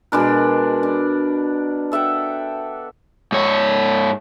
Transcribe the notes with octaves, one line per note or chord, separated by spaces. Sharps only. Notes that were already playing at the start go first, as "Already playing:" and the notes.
B2 G#3 D4 A#4
D4
A4 E5 F#5 G5
G#2 C#5